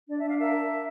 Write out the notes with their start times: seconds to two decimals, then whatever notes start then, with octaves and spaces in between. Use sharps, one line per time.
0.09 D4 D5
0.18 E5
0.24 D4 F5
0.38 A#4 E5